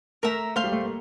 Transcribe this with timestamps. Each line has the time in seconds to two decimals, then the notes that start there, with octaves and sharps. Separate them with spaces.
0.23 A3 A#4 E5 A#5
0.56 A3 C5 F5 C6
0.64 G3
0.72 A3
0.81 A#3